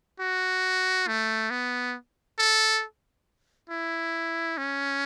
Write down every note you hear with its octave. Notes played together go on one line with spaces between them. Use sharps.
F#4
A3
B3
A4
E4
C#4